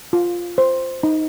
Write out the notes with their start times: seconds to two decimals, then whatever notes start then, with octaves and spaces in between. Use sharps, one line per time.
0.13 F4
0.58 C5
1.03 D#4